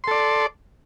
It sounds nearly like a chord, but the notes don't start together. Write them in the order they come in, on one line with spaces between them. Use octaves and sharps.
C6 A4 D5